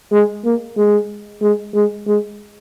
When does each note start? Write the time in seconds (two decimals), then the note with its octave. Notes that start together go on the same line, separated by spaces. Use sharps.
0.12 G#3
0.45 A#3
0.77 G#3
1.42 G#3
1.75 G#3
2.07 G#3